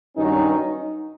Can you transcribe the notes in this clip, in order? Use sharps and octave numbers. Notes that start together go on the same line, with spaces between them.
G2 D#3 F#3 C#4 D#4